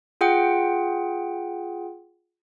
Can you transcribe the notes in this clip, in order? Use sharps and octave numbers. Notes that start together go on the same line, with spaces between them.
F4 G#4 F#5 G5